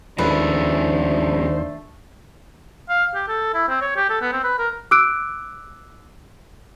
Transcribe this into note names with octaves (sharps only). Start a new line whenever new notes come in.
D#2 F3 G#3 A3 C#4 D4 B4 C5
F5
G4
A4
E4
C4
C#5
G4
A4
B3
C4
B4
A#4
D6 E6 F#6 D7